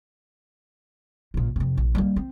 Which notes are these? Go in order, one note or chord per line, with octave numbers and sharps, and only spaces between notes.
A1 A#2
F2 C3
A#1
G3 A#3
C4